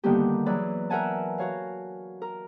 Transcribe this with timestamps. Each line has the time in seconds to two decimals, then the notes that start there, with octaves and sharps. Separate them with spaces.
0.04 D3 D#3 G3 A#3 B3 G4
0.46 E3 F#3 G#4 B4 D5
0.90 A#4 B4 E5 F#5 G#5 A5
1.38 F#4 C#5 F5
2.22 A#4